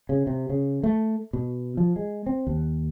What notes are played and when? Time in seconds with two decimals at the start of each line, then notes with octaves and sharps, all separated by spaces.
0.09 C#3
0.27 C3
0.50 C#3
0.83 A3
1.33 B2
1.77 F3
1.96 G#3
2.27 C4
2.47 D#2